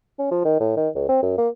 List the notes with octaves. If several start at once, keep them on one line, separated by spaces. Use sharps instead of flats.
C#4
F3
D#3
A2
D#3
C#2
C4
F#2
A#3